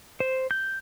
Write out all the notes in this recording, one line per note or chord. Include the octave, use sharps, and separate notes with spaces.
C5
G6